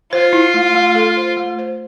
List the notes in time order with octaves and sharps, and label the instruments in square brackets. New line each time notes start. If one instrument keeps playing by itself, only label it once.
[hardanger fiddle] F4 [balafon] C5
[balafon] E4
A3
A3
A4
C5
A3
C5